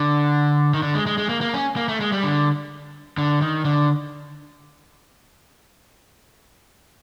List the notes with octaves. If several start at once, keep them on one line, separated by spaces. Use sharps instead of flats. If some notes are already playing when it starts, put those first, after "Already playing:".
Already playing: D3
D#3
D3
G#3
G#3
G#3
A#3
A#3
C#4
A#3
A3
G#3
G3
D3
D3
D#3
D3